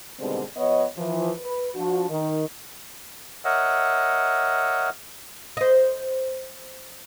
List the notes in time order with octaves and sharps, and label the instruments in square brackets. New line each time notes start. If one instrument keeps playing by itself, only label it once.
[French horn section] B2 D3 D#3 G3 G#3 C4
F3 B3 C#5 D#5
E3 F3
B4
F3 D4 F#4
D#3
[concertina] A#4 C#5 D#5 E5 F#5
[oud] C5 D#5